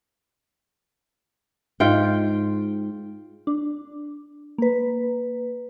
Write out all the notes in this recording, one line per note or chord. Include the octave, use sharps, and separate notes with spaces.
G#2 F4 G5
D4
A#3 B4